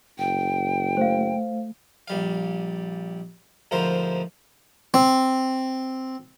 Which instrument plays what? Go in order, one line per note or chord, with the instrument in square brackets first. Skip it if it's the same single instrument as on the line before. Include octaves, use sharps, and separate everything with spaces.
[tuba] F#1 [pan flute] G5
[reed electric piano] A3 [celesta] C5 F5
[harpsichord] A#1 G3 F5
D2 G#2 F3 E4 A#4 C5
C4